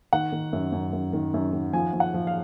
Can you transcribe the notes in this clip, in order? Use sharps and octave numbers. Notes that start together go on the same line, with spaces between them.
D#3 F#5
D#3
F#2
F#2
F#2
D#3
F#2
D#3
F3 G#5
F3
F#5
F3
F5